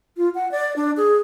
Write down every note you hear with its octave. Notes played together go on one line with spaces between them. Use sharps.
F4
F#5
D5
D4
G#4